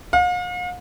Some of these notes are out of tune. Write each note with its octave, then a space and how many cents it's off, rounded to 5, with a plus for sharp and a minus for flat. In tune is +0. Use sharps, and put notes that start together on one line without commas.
F5 +45